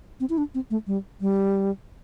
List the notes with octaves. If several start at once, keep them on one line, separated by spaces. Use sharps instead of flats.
C4
E4
D4
C4
A3
G3
G3